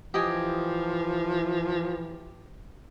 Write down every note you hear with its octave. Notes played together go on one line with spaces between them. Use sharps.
E3 F3 G4 D#5 G#5